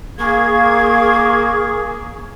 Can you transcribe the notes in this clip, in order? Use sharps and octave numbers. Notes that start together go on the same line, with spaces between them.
A#3 G#4 F5 C#6 G#6